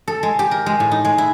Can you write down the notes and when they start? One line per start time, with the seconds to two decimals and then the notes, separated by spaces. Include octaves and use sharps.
0.08 A4
0.23 G#3
0.39 G4
0.51 A#4
0.66 G#3
0.80 A2
0.91 D#4
1.05 G#3
1.18 E4